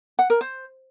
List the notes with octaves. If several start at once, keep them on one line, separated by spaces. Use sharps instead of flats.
F#5
A#4
C5